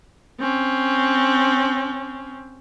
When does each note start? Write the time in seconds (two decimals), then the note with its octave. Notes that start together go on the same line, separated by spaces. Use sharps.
0.40 C4 C#4